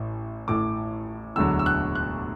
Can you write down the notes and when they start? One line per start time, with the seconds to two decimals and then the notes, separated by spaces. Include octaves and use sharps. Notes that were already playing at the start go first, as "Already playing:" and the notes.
Already playing: A1 A2
0.48 A1 A2 A3 D6
1.36 E1 D2 D3 F#3 E6
1.59 E6
1.66 F#6
1.95 F#6